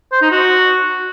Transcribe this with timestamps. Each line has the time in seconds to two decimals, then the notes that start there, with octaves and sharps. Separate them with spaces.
0.12 C5
0.22 D#4
0.31 F#4